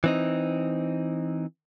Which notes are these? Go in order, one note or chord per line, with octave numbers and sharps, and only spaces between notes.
E3 C4 D#4